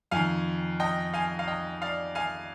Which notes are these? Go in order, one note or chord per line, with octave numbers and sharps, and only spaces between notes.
F2 D#3 F5 G#5
D#5 G5
F5 G#5
F5
D#5 G5
D5 F5
F5 G#5